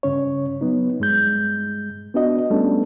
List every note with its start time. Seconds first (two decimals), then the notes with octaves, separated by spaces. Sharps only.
0.03 G2 C#3 C#4 C#5
0.61 F#3 B3 D#4
1.00 G2 G#3 G6
2.14 B3 D4 F#4 D#5
2.50 G3 A3 B3 C#4 D4 A4